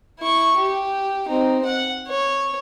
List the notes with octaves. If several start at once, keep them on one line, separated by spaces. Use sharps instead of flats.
E4 C#6
G4
C4 D#4
F#5
C#5